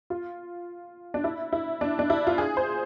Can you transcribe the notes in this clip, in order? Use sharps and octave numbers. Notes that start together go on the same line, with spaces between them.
F4
D4
E4
E4
D4
D4
E4
F4
G#4
C5